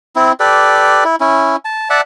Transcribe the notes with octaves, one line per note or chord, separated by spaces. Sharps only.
C4 E4
G4 A4 B4 D5
E4
C#4 E4
A5
D5 E5 F#5 A5